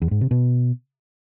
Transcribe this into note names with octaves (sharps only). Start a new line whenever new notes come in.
E2
G#2
C3
B2